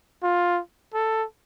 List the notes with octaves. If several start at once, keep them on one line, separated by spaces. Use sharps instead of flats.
F4
A4